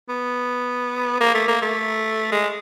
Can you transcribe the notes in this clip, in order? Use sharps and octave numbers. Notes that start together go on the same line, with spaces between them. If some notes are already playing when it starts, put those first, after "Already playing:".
B3
A#3
A3
A#3
A3
G#3